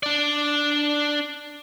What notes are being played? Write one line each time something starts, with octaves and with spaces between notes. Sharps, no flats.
D4 D5